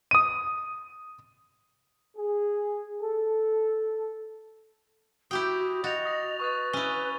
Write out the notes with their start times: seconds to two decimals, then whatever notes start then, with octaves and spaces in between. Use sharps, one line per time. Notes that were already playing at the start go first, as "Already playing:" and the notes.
0.11 D#6 D#7
2.17 G#4
3.01 A4
5.31 E4 F#4 G4 G5 D#6 G6
5.84 F#4 D#5 A6 F7
6.05 D#6 A#6
6.40 B4 C#6 D#6 A6
6.73 C#4 E4 D#7 G7